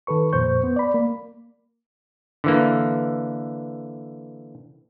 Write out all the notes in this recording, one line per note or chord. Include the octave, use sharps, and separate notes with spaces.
D#3 A4 B4 C#6
F2 A#2 C5 C#6 G6
B3
D5 B5
A#3
D3 E3 A#3